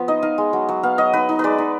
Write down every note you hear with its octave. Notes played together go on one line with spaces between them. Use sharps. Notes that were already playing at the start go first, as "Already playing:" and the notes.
Already playing: F3 B3
D#4 D#5
D#4 F5
G#3
F#3
F#3
B3 F5
F#3 D#5
D#4 B4
D#4
G#3 B4 D5
D#4